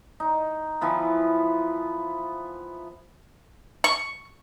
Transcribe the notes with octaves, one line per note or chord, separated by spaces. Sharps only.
D#4
E3 F3 B3
C#6